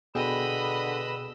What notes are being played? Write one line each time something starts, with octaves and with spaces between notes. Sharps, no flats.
B2 D3 G#4 B4 D#5 G5 B5 E6